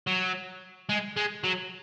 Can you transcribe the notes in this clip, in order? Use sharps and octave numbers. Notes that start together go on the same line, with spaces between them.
F#3
G#3
G#3
F#3